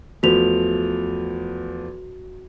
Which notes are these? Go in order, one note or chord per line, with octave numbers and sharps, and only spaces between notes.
E2 F3 A3 F#4 F7